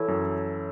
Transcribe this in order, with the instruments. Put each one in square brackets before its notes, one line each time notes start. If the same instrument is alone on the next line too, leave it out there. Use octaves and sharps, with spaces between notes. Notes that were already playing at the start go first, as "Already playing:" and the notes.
Already playing: [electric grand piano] E3 E4 [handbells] A4 C#5
[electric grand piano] F#2